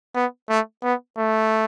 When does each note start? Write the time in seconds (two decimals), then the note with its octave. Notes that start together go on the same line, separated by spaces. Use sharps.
0.15 B3
0.49 A3
0.83 B3
1.18 A3